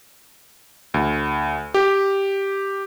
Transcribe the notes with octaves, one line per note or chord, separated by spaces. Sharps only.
D2
G4